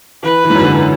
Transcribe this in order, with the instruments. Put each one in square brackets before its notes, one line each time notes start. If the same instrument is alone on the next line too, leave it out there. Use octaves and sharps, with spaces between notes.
[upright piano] E3 [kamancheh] B4
[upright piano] E3
G#2
F#2
D3
E3